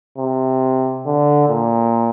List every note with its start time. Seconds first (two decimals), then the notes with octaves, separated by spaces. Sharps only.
0.18 C3
1.06 D3
1.49 A#2